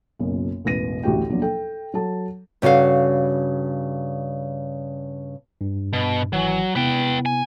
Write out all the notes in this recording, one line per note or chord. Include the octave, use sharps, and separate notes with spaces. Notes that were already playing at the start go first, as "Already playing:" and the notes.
F#1 B1 F#2
E1 A1 B4 A#6 D#7
A1 D2 A2 F#4 G4 G5
D#2 B2 F3 F#3 D4
A4 G5
F#3 A4 A5
G2 C#3 F#4 A4 F5
G2
B2
G#1 E3 F#3 G#5
C3 B3 E4 B4 G5
G#5